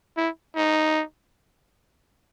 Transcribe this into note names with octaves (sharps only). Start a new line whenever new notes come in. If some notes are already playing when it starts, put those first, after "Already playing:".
E4
D#4